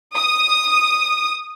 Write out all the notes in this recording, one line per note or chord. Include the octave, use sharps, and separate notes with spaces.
D#6